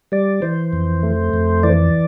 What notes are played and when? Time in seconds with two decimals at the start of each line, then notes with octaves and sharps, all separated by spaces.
0.12 G3 D5
0.42 E3 C5
0.73 F2
1.03 A3
1.34 F2
1.63 E3 D5